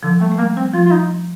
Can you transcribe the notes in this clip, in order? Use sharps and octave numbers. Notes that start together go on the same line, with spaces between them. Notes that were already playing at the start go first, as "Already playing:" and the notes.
D3 F3
G3 A3
A3
G3 A#3
G3 C4
F3 F4
F4
D#4